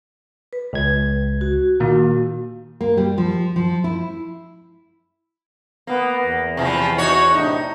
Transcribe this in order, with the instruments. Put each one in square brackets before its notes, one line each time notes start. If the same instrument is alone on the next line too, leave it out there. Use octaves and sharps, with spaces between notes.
[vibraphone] B4
[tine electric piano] C#2 G#6
[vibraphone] F#4
[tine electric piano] A#2 D#3 A#3
[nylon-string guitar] A#3
G3
F3
F3
E4
[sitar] A#3 [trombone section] B3
[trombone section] E2
[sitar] C3 E3 F3
D#4 F#4 C#5
[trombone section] A2 C3 D4 [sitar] D#4